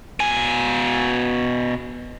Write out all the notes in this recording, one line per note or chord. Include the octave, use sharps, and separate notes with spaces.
B2 G#5